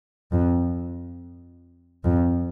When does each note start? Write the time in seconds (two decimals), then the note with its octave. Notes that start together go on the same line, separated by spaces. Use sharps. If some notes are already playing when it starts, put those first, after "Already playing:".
0.32 F2
2.04 F2